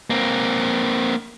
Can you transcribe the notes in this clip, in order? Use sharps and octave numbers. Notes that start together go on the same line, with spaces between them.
A#3 C4